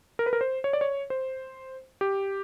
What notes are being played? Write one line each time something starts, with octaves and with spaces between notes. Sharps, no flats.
A#4
B4
A#4
C5
C#5
D5
C#5
C5
G4